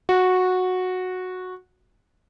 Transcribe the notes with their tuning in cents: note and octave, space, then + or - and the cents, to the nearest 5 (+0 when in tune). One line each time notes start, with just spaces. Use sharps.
F#4 -10